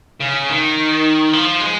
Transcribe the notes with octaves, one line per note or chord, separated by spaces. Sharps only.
C#3
D#3
F3
G#3